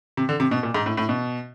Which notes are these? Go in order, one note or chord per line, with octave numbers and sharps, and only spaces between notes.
C3
D3
C3
B2
A#2
G#2
A2
A2
B2